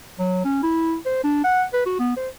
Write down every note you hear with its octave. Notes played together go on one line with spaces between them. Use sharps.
F#3
C#4
E4
C5
D4
F#5
B4
F#4
B3
C5